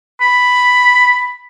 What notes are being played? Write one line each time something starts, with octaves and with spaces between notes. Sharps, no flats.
B5